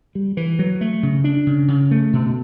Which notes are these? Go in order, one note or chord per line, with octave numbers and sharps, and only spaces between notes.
G3
E3
F#3
A3
C#3
D4
C#3
C#3
A3
B2